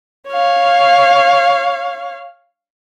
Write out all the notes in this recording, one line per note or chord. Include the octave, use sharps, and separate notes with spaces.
C#5 F5